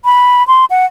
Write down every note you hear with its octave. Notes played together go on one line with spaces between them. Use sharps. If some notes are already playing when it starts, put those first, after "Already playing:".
B5
C6
F#5